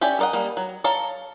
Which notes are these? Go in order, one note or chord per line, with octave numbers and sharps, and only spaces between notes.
C#4 G4 C#5 D5 E5
A4 A#4 D5 D#5 F#5
G3 A#3
F#3
A4 C#5 F5 A5 A#5